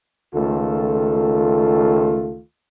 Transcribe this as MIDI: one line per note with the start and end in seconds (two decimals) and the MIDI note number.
0.34 2.40 37
0.34 2.40 51
0.34 2.40 57
0.34 2.40 65
0.34 2.40 69